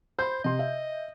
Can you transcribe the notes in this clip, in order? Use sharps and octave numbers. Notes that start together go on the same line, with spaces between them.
C5 B5 G6
C3 D#5 C6
E5